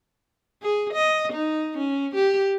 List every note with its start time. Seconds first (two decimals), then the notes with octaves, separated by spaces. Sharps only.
0.62 G#4
0.93 D#5
1.32 D#4
1.78 C#4
2.15 G4